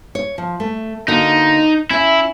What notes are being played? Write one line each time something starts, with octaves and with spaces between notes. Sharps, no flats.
C#5
F3
A3
D3 A#3 D#4 F#4
C#4 E4 E5